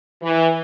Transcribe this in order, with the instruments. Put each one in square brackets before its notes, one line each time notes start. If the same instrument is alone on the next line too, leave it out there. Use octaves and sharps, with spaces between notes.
[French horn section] E3